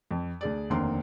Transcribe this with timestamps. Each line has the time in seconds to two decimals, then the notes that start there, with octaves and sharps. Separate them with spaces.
0.11 F2
0.41 D2 G#4 D5
0.70 F1 D#2 D3 A#3 C4 C6